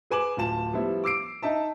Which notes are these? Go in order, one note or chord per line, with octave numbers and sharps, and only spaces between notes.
G#4 B4 G#5 D6 E7 F#7
D1 F4 A5 E7
F3 G3 B3 E4
D6 E6 C7 D7
D#4 D#5 E5 A5